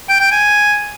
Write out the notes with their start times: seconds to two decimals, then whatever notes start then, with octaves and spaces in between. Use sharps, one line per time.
0.09 G5
0.20 G5
0.32 G#5